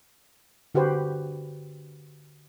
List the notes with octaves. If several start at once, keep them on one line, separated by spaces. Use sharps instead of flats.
D3 F#4 G4 B4 C5